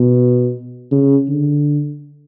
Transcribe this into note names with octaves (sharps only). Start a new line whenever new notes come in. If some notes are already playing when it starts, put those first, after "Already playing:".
Already playing: B2
C#3
D3